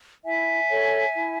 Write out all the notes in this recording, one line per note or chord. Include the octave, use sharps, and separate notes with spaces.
E4 E5 G#5
A4 C#5
E4